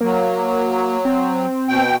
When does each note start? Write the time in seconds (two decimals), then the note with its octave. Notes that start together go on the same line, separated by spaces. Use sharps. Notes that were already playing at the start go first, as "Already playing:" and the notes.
0.01 F#3 A#3
1.05 C4
1.69 B2 G5